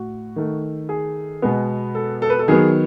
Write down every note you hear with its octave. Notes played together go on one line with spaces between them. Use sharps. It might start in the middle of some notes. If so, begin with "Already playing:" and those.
Already playing: A2 F#4
D#3 A3
G#4
B2 G#3 B3
A4
A4
B4
A4
D#3 F#3 B3 G#4